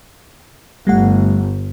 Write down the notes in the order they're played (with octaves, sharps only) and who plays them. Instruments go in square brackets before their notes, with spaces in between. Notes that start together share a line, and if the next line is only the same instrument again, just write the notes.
[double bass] G1 [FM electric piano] G3 A3 F#5